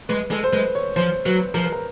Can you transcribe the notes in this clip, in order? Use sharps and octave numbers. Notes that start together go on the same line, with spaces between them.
G#3 B4
G#3 A4
C5
G#3 B4
C#5
F3 C5
F#3 B4
F3 A#4
B4
A#4